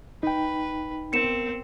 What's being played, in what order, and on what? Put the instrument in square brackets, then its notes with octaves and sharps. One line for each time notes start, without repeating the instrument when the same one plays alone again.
[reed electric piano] D#4 G5 [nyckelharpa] B4
[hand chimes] B3 A#4 D7 [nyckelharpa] C4 [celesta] C#7 E7